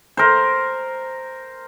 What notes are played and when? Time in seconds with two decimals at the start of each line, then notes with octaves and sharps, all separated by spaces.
0.17 A#4 C5